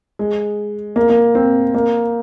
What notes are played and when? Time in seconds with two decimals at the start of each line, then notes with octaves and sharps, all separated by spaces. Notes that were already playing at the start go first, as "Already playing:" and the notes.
0.19 G#3
0.96 A#3
1.10 A#3
1.35 C4
1.75 A#3